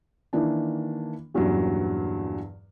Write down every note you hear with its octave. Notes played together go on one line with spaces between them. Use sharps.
D#3 E3 A#3 D4
E2 G2 A#2 F#3 C#4